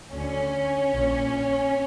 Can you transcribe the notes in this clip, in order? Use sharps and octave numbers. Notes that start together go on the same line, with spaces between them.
D2 D3 C#4
A#1 A#2